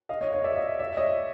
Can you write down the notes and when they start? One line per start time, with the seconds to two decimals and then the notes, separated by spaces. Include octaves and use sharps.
0.09 D#5 F5
0.21 C#5 D#5
0.33 C#5 D#5
0.44 D5 E5
0.56 D#5 F5
0.79 D5 E5
0.97 C#5 D#5